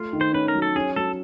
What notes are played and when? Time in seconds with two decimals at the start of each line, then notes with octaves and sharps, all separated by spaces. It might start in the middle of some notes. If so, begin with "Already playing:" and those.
Already playing: A3 F4
0.13 D#3
0.21 C5
0.33 C#4 B4
0.48 A#4
0.55 F#3
0.62 A4
0.76 C#4 G#4
0.96 F#3 A4